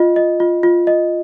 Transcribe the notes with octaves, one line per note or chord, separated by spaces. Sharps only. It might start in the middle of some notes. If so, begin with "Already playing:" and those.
Already playing: F4 D#5
D#5
F4
F4
D#5